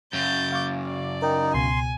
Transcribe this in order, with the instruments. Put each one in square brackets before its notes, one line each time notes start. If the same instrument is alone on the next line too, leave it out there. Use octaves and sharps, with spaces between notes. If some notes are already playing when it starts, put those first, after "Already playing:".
[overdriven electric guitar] F#2 C#3 [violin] G6 A6
[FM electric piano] F5 C#6 D6
[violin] D5
[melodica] D#4 [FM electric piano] A#4 G5
[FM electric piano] C#2 B2 [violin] G#5 [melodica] C6